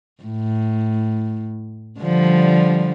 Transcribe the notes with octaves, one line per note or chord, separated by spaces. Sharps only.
A2
D3 F3 G3